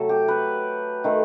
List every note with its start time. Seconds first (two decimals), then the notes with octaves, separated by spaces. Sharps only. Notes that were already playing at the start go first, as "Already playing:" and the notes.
Already playing: C3 F#3 A3 A4
0.09 G4
0.28 B4
1.04 D#3 A3